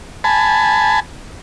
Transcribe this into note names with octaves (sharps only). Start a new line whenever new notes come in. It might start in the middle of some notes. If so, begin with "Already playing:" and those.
G#5 A5 B5